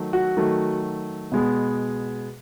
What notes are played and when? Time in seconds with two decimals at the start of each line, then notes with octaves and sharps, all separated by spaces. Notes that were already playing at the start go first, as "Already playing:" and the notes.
Already playing: D#3 F#3 A3
0.13 F#4
0.37 D#3 F#3 A3
1.32 B2 G#3 B3